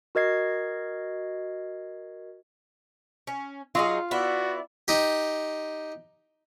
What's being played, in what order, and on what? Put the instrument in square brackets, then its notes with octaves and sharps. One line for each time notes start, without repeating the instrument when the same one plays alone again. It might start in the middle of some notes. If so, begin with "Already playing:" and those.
[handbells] F#4 A#4 D#5 G#6 C7
[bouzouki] C#4
[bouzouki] F#3 D#4 G#4 [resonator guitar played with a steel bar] F4
[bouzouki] B3 E4 [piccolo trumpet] F#4 [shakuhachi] D5
[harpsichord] D#4 G4